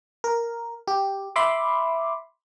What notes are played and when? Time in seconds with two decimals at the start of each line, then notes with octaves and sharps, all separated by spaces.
0.24 A#4
0.88 G4
1.36 E5 B5 C6 D6